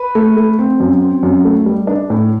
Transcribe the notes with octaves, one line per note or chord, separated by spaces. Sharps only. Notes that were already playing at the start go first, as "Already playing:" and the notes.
Already playing: B4
A3
A3
C4
F#2
C4
F#2
A3
G3
D4
A2